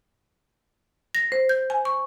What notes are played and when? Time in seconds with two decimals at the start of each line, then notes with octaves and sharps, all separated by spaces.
1.15 A#6
1.32 C5
1.49 G6
1.70 G#5
1.85 C#6